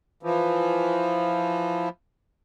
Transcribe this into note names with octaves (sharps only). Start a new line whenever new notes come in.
E3 F3